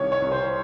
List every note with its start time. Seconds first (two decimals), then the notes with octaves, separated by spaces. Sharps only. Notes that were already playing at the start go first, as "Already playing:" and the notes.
Already playing: C2 D#3 C#5
0.12 C#5
0.22 C2
0.32 C5